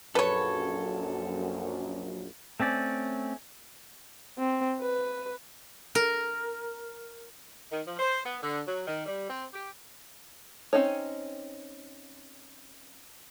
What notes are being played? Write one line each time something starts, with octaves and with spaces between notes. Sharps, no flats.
A#1 F#2 A4 B4 C#5
A3 C4 C#4 D5
C4
B4
A#4
D#3
F3
C5
B3
D3
F#3
D#3
G3
C4
G4
C4 C#4 D#4 C#5